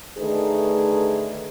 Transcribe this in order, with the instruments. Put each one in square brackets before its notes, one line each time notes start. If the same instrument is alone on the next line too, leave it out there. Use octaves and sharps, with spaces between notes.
[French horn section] D3 D#3 A3 D#4 G#4 B4